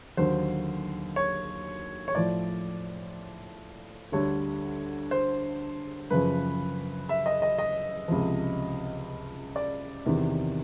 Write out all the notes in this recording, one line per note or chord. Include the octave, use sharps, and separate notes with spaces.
D#2 D3 F#3 C5
C#5
C#5
A2 F3 D5
D2 D3 G3 C#5
C5
F#2 C#3 F3 B4
E5
D#5
D#5
D#5
C#2 C3 F3
D5
E2 C3 D#3